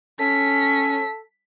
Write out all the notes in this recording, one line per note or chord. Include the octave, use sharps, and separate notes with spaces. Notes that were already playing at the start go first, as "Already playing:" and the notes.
C#4 A4 B6